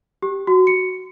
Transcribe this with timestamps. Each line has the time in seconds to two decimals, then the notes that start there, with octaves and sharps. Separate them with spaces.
0.22 G4
0.47 F#4
0.67 C#7